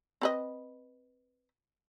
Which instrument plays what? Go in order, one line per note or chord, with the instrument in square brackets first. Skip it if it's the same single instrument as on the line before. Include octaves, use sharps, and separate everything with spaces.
[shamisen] C4 B4 D#5